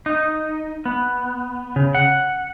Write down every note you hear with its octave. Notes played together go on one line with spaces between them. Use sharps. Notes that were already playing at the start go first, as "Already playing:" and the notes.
D#4
B3
C#3
F#5